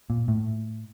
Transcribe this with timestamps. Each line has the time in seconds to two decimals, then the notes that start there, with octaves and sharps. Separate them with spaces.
0.10 A#2
0.28 A2